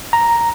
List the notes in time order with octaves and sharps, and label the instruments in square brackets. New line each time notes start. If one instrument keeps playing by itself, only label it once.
[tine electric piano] A#5